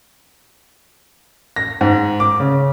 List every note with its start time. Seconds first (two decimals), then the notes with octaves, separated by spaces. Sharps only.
1.56 A#6
1.81 G#2
2.20 D6
2.40 C#3